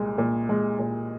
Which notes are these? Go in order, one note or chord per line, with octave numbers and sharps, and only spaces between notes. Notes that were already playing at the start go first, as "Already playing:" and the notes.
Already playing: C2 A#2 G#3
A#2
G#3
A#2